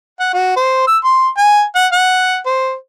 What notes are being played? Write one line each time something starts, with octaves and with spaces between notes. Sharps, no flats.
F#5
F#4
C5
E6
C6
G#5
F#5
F#5
C5